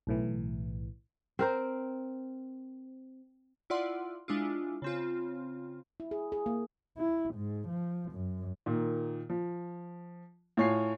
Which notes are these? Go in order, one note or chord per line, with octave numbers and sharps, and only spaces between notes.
B1 A2 E3
C4 A#4 C5
E4 F4 D5 F#5 C6
G#3 D4 E4 F4
C#3 C4 F4
E4
G#4
G#4
A#3
E4
G#2
F3
F#2
A#2 D#3
F3
A2 F4 C#5 G#5 C7